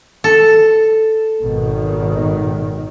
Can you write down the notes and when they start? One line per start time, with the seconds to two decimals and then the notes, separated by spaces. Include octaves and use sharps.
0.24 A4
1.43 G#1 B2 D#3